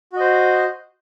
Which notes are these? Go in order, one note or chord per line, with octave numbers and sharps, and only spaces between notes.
F#4 C5 D#5